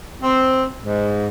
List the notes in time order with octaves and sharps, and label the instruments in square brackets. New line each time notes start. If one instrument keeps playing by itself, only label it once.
[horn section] C4
G#2